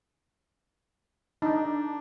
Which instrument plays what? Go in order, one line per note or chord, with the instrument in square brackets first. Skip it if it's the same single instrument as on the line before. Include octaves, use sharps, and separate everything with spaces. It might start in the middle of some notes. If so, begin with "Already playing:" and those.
[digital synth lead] D4 [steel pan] D#4